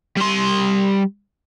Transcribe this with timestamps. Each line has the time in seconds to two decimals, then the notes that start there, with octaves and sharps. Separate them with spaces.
0.17 G3 C6